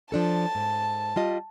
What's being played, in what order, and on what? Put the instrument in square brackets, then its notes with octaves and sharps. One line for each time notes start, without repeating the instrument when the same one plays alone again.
[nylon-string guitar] F3 D4 A4 [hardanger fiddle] A5
[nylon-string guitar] G#2
G3 F4 D#5